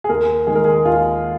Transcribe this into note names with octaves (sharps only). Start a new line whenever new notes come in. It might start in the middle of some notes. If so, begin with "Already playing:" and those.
G#4
D#2 A#4
D#3 G#3 G#4
A#4
G#4
D#2 F4